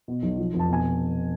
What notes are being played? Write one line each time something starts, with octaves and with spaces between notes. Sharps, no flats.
B2
B1
F3
F1
A5
B2 G#5